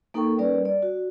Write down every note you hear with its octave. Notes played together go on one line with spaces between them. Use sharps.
A#3 D#4 A4 A#4 G5 C#6
G3 C#4 A#4 B4 D5
D5
F#4